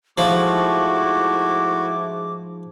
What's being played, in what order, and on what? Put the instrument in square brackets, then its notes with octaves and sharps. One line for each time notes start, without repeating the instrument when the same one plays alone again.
[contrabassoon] G#2 [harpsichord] F3 [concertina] A3 E4 F#4 [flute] D6